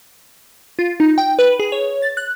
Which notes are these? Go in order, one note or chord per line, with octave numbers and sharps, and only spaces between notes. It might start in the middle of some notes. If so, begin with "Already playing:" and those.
F4
D#4
G5
B4
G#4
C#5
A6
F#6